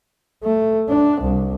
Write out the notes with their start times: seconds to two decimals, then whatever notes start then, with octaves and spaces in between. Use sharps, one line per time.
0.43 A3
0.89 D4
1.21 C2